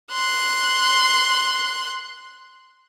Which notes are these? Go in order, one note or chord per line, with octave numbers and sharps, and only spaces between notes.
C6 F#6